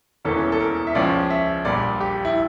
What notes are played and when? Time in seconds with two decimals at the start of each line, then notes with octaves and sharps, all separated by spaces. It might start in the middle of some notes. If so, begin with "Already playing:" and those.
0.25 E1 E2 E3 A#3 C#4 A4
0.52 A4
0.60 A#4
0.87 E5
0.95 C#2 C#3 F3 C#4 D5
1.30 E5
1.65 A#1 A#2 G3 D5
2.01 G4
2.25 E4